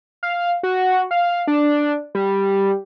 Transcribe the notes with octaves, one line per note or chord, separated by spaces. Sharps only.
F5
F#4
F5
D4
G3